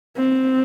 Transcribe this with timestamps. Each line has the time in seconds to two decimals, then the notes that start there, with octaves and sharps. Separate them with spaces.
0.17 C4